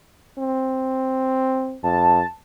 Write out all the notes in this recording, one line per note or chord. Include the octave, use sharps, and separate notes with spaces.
C4
F2 A5